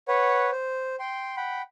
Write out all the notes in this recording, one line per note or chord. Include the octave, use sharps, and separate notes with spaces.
B4 C#5 F#5
C5
G5 C6
F#5 G5 B5